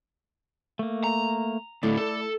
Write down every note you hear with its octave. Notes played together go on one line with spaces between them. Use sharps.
A3 A#3
A#5
D2 A2 A3 E4 D5
A4